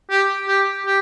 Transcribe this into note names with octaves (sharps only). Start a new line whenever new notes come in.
G4
G4
G4